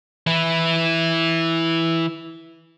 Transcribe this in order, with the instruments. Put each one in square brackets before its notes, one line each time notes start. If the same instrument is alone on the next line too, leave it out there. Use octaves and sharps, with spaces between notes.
[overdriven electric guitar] E3 E4